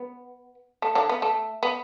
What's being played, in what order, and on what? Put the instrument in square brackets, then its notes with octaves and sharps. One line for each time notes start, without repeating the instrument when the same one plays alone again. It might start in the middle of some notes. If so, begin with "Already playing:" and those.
Already playing: [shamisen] B3
A3
D3 D4
B3
A3
B3